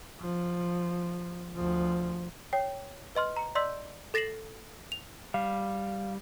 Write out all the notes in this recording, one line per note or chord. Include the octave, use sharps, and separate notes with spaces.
F3
D2 F3
C#5 G5
B4 D#5 C6 F6
A#5 C#7
D5 D#5 C6 E6 G6 B6
A4 A6 A#6 C7 E7 F#7
F7
G3 F5